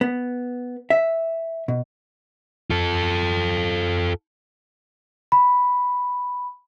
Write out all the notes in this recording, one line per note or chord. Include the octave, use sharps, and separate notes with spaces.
B3
E5
B2
F4 A4
B5